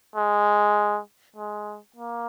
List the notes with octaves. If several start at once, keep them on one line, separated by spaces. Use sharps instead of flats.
G#3
G#3
A#3